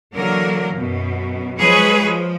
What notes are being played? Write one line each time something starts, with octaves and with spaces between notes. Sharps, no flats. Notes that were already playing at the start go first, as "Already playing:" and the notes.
D3 E3 F#3 A#3 A#4
F#2 B2
F3 F#3 G#3 G#4 B4 C#5
F3